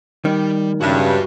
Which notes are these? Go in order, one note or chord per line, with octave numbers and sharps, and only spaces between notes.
D#3 G3
G2 C#3 F#4 E5